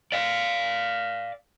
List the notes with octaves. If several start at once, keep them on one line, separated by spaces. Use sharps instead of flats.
D5 F5